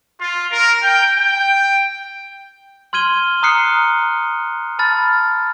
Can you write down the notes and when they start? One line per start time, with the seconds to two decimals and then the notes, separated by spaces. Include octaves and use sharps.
0.20 F4
0.52 A#4
0.83 G5
1.18 G5
2.93 C6 F6 G#6 D#7 G7
3.43 A#5 D#6 F6 F#6 C7 C#7
4.79 A5 B5 F6 A6